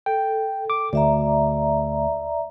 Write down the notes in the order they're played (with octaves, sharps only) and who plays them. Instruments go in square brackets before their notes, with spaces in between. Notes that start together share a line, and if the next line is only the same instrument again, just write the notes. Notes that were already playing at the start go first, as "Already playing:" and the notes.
[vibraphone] A4 [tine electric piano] G5
[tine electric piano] D6
[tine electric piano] D2 [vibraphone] D5 E5 A#5